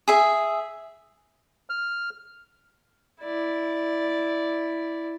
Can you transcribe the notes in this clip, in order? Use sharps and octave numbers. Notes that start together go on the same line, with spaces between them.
G#4 E5
F6
E4 D5